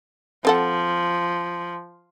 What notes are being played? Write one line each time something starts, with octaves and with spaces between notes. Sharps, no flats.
F3 C4 A4 F#5